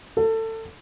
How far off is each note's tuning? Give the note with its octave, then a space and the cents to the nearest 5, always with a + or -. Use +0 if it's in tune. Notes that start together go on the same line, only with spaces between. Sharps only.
A4 +25